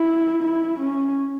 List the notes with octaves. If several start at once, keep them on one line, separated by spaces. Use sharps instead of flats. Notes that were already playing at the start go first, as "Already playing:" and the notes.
Already playing: E4
E4
C#4